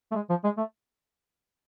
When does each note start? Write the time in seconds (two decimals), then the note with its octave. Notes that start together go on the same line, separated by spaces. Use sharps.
0.12 A3
0.15 G#3
0.30 F3
0.44 G#3
0.58 A3